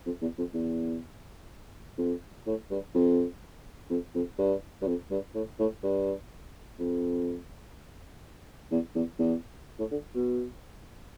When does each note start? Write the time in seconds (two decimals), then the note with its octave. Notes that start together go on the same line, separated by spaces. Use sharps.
0.06 F2
0.22 E2
0.38 F2
0.54 E2
1.98 F2
2.47 A2
2.71 G2
2.95 F2
3.90 F2
4.15 F2
4.39 G2
4.82 G2
4.87 F2
5.11 G2
5.35 A2
5.59 A2
5.83 G2
6.79 F2
8.71 E2
8.95 E2
9.19 E2
9.79 A2
9.91 D3
10.15 B2